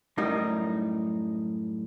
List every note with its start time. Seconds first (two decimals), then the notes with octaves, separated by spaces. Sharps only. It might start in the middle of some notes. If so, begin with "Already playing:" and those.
0.18 F#2 A2 G3 D#4 A#4